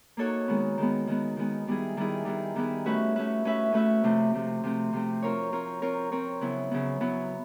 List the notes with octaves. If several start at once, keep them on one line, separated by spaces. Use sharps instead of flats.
A#3 D#4 F#4 A4 C#5
D#3 G#3 B3
D#3 G#3 B3
D#3 G#3 B3
D#3 G#3 B3
D#3 G3 B3 E4 G#4
D#3 G3 B3 E4 G#4
D#3 G3 B3 E4 G#4
D#3 G3 B3 E4 G#4
A3 C#4 F#4 B4 E5
A3 C#4 F#4 B4 E5
A3 C#4 F#4 B4 E5
A3 C#4 F#4 B4 E5
C3 F3 A3 C4
C3 F3 A3 C4
C3 F3 A3 C4
C3 F3 A3 C4
C4 F4 A#4 C#5
C4 F4 A#4 C#5
C4 F4 A#4 C#5
C4 F4 A#4 C#5
C#3 F#3 B3 E4
C#3 F#3 B3 E4
C#3 F#3 B3 E4